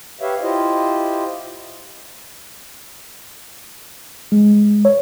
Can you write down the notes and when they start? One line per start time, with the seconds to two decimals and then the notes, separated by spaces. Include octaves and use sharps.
0.21 G4 B4 C#5 E5 F5
0.41 E4 F4 G4 C5 D#5
4.32 G#3
4.85 C#5